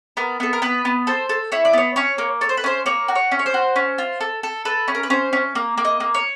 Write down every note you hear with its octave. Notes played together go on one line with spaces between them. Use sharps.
B3 A#4
B3 A4
A#4
B3 B4
B3
A4 C5
A4
E4 C#5
D5
B3 C#5
C#4 C#5
A#3
A4 C#5
C5
B4
C#4 C5
A#3 C#5
F#4
C#5
C#4
C#5
C5
F#4
C#4
F4
A4
A4
A4 B4
C#4
A#4
B4
C#4 C5
C#4
A#3
A#3
D#5
A#3
C#5